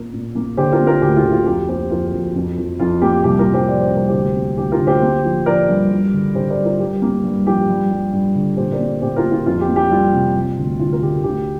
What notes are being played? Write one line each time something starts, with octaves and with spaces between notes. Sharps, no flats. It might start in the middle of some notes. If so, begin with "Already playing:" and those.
Already playing: A#2 A#3 A#4
A#2
A#3
D3 G4 C5
F4 A#4
A#3
F4 A#4
D2 G4
F4
D2
F4
F2 G4
A#3 G4 C5
F2 F4 A#4
F2
F2
F2
F2 F4
A#3 G4
C2 G4
F4 A#4
C2
G4 C5
F3 D5
C5
C2 A#4
D2 G4 C5
A#3
D2 G4
F4 A#4
D2
G4 C5
A#3
F3
F3 A#4 D5
G2
G3
D3
D3 G4 C5
A#4 D5
G3
F4 A#4
G2 G4
A#3
G2
F3 G4
G2
G3
G2
D3
A#2 G4 C5
A#4 D5
A#3
A#2 G4 C5
F4 A#4
A#3
F4
F2 F4
G4
A#3
G4
G3 F4
C3
G3
D2
D2 F4
A#4
D3 G4
D2 G4